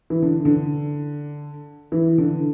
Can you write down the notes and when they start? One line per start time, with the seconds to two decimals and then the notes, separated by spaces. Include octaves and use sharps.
0.10 E3
0.22 D3
0.45 D3
1.92 E3
2.18 D3